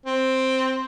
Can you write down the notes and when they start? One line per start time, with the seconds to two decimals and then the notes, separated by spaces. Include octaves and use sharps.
0.06 C4